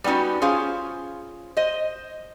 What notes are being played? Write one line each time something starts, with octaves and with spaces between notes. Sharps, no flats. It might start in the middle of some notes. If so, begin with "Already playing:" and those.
G3 B3 C#4 D#4 F#4
C#4 F4 G#4 C5 F5
C5 D#5